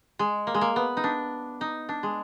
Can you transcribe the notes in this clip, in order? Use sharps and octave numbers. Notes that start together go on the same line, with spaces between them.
G#3
A#3
G#3
A#3
B3
D#4
D4
D#4
D4
G#3